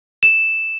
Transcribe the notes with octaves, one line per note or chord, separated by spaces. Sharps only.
E7